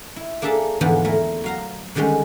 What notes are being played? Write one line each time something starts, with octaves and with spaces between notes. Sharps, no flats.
E4
A#3 D4 G#4 A4 E5 A5
E2 G#2 D3 E3 F3 B3
A3 E4 A#4
F#3 F5 A#5
D3 D#3 G3 G#3 C#4